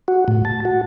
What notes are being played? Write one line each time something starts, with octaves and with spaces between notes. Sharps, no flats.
F#4
A2
A5
F#4